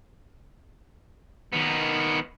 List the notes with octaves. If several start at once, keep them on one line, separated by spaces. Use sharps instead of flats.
D#3 B3